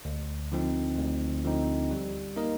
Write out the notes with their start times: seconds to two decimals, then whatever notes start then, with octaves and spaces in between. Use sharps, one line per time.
0.05 D2
0.52 D3 F3 C4 D#4
0.98 D2
1.45 D3 F3 C4 D#4
1.91 G3
2.36 A#3 D#4 A#4 D#5